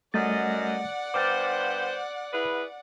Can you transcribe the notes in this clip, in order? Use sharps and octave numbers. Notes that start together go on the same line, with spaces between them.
F#2 G3 A3 D5 D#5 F#5 A6
G2 B3 C5 D6 F6 A6
E4 G#4 B4